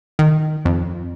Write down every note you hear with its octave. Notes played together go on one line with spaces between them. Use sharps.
D#3
F2